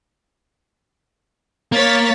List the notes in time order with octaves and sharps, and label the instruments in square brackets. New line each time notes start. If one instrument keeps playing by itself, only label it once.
[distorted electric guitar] A#3 [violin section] C#5 A6 B6